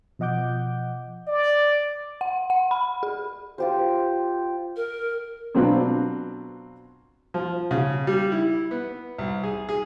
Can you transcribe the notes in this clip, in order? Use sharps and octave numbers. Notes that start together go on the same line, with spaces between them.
B2 F3 D#5 F#5 D6 G6
D5
F#5
F#5
B5
G#4
F4 G4 C5
A#4
B2 F#3 C4 D4 F4 B4
F3
C#3
G3
E4
B3
C2
G#4
G#4